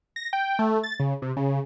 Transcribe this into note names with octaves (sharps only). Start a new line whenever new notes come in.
A#6
G5
A3
A6
C#3
C3
C#3